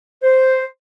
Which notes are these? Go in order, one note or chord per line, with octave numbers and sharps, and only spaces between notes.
C5